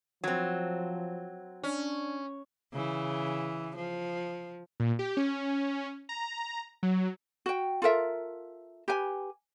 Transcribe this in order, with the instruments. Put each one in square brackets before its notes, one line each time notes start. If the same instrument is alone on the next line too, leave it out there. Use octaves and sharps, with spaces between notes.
[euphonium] F3 [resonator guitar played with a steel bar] F#3 C4
[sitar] C#4 [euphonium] D4
[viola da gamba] C#3 E3
F3
[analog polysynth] A#2
G4
C#4
A#5
F#3
[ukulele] F#4 G5
F4 A4 A#4 E5
G4 B4 G#5